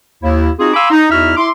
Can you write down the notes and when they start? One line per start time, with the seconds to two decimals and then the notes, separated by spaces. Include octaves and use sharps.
0.23 D#2 E4
0.59 C4 D#4 F4 F#4 G#4
0.74 F5 G#5 B5 C6 D6 E6
0.91 D#4
1.11 E2 D#4 E4 F#4 E5 F6
1.37 E4 C6 D6